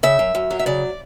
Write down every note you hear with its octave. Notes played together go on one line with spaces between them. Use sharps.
C#3 E5
F#2
F#2
F#3
E5
C#3 D5